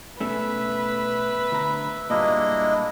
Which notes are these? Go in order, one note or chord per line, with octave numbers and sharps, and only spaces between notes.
B2 A3 C#4 B4 E5
D2 A#5
G2 A#2 G#3 A#3 D4 E4 D#5